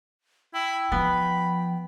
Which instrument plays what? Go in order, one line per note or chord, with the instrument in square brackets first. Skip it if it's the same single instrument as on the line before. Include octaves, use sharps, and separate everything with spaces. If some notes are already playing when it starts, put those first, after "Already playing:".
[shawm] E4 [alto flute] G5
[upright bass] F3 [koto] B3 [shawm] B5